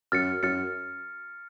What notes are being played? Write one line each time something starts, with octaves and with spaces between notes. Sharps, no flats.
F#2 F6 A6 C#7
F#2 F6 A6 C#7